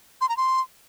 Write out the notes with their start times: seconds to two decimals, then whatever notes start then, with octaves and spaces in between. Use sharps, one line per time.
0.21 C6
0.29 A#5
0.37 C6